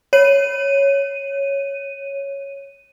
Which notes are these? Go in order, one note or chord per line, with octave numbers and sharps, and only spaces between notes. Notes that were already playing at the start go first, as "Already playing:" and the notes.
C#5 D#7